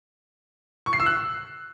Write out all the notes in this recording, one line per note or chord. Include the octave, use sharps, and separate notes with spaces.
C#6
C7
E6
F#6